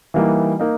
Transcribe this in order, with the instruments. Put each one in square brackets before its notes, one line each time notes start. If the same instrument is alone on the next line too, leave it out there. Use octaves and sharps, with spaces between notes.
[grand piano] E3 G3 A#3 D#4
A#3 D#4